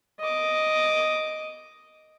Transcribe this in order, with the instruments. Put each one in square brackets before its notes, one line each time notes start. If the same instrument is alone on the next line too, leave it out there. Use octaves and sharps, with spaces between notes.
[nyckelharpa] D#5 D6